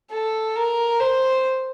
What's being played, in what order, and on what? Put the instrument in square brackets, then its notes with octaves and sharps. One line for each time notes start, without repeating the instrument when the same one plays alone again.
[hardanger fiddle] A4
A#4
C5